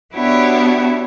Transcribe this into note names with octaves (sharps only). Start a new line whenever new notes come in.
B3 D4 E4 F#4 G4 C#5